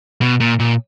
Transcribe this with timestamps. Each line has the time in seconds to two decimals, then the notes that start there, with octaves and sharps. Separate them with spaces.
0.21 B2
0.40 A#2
0.60 A#2